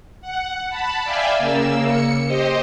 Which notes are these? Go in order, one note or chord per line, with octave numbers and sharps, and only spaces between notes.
F#5
A5 B5
D5 E5 F5 G5 G#5
C#3 A#3 E6
C#7
G4 C5 D#5